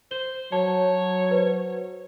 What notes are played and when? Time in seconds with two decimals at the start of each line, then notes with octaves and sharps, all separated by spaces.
0.11 C5 G7
0.52 F#3 C#5 A5
1.31 B4 C5